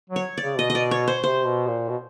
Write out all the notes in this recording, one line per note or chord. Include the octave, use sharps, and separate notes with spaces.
F#3
C#5
D5
C#3
B2 D#5
D#5
D5
C#5
C5
C3 C5
B2
A#2
B2